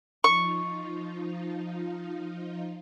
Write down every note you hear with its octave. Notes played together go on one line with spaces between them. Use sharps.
F3 D#4 F4 C#6